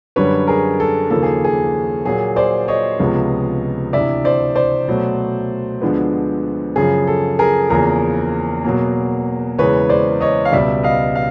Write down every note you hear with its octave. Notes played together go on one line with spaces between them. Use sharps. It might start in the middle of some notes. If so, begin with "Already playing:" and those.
F#2 D3 G3 B4 C#5
G#4 A#4
A4
D#2 C#3 F3 A#3 A4
G#4
G#4
A#2 F#3 A#3 G#4
C5 D5
C#5 D#5
C#2 C3 F3 G#3 B3
D2 C3 E3 D5 E5
C5 D5
C5 D5
B2 F#3 A3
D2 D3 F3 G#3 B3
F#2 C#3 F3 G#4
A4
G#4 A#4
E2 C#3 F3 A#3 G#4 A#4
B2 F#3 A#3
E2 C#3 E3 G#3 B4 C#5
C5 D5
C#5 D#5
F5
C#2 B2 G3 B3 D5 E5
D#5 F5
F5